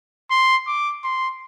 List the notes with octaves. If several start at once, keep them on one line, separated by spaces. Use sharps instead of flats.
C6
D6
C6